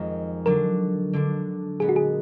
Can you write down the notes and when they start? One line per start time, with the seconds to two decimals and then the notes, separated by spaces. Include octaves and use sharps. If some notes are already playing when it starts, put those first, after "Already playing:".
Already playing: F2 D#3 G#3
0.46 D3 F#3 D4 A#4
1.13 D3 F#3 D4
1.80 A#2 G#3 B3 G#4
1.89 F#4
1.96 G#4